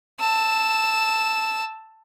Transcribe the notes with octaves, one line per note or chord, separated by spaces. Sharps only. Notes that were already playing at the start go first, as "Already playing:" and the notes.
A5 E6